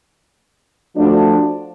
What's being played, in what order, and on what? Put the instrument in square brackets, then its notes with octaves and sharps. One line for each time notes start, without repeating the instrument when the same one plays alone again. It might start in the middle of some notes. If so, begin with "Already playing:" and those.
[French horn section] F3 A3 D4 F#4